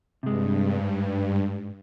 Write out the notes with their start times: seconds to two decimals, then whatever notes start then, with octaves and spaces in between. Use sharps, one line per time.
0.23 G2 C3 G#3
0.78 G#2